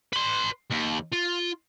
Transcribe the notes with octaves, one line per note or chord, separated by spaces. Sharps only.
B4 C6
D#2
F4